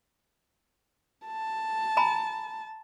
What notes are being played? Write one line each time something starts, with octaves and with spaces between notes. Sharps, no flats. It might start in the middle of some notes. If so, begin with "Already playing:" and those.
A5
G#5 A#5 B5